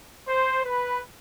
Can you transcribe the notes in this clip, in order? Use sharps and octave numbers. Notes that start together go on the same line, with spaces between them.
C5
B4